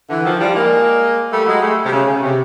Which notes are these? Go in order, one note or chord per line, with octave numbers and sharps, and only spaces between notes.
D3 E3
D#3 F3
F3 G3
G#3 A#3
G3 A3
F#3 G#3
G3 A3
C3
C#3
C#3
C3